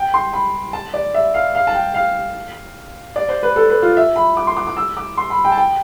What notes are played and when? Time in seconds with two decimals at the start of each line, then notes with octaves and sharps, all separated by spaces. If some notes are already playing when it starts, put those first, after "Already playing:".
Already playing: G5
0.14 C6
0.33 B5
0.73 A5
0.94 D5
1.14 E5
1.34 F5
1.55 F5
1.67 A5
1.74 G5
1.94 F5
3.16 D5
3.29 C5
3.43 B4
3.56 A4
3.70 B4
3.82 F4
3.97 E5
4.16 B5
4.37 D6
4.47 C6
4.57 D6
4.67 D6
4.77 E6
4.97 D6
5.17 C6
5.30 B5
5.45 G5
5.52 A5
5.58 G5